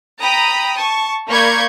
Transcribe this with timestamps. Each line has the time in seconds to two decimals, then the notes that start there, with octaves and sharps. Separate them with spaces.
0.20 G5 A#5 B5 D#6
0.78 A5 C#6
1.27 A#3 D5 B5 C#6 G6 G#6